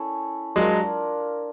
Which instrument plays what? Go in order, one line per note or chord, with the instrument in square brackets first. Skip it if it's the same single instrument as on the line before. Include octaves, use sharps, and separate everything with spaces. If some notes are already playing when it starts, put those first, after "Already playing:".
Already playing: [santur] C#4 E4 A4
[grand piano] F#3 G#3 [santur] D4 F4 A#4